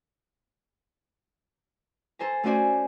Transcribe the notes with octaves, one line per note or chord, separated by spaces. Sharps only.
A4 C5 G#5 A#5
A3 C#4 F#4 C5 D5 G#5